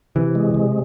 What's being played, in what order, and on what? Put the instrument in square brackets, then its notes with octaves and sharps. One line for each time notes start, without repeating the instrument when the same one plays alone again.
[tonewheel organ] C3 [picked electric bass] E3
[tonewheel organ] G#3
C3